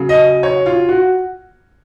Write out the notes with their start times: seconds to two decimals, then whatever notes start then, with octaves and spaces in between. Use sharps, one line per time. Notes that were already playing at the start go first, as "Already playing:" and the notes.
Already playing: C#3 F#3
0.09 D#5
0.43 C#5
0.66 F4
0.89 F#4